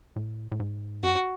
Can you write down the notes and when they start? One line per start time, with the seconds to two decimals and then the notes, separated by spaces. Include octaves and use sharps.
0.16 A2
0.52 A2
0.60 G#2
1.03 F#2 F#4